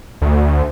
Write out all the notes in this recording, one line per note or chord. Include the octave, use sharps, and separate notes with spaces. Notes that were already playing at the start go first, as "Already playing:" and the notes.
D2